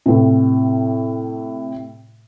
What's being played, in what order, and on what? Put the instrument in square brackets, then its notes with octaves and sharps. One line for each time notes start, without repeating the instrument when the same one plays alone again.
[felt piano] A2 C3